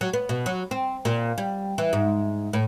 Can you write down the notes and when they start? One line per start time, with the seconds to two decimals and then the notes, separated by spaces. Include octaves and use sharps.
0.01 F#3
0.13 B3
0.29 B2
0.46 F#3
0.71 C4
1.05 A#2
1.38 G3
1.78 E3
1.93 G#2
2.53 A2